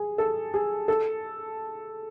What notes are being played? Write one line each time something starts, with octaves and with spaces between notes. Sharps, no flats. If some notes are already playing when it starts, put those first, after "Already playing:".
Already playing: G#4
A4
G#4
A4